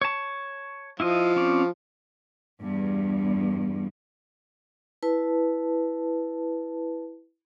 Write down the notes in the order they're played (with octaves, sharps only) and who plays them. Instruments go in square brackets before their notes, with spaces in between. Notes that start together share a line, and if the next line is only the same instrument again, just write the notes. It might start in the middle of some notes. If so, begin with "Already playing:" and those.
[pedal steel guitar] C#5 A5
[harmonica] F3 [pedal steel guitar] E4 F4 D#5
[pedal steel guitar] C4 C#4 D5
[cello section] E2 G2
[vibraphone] E4 B4 A5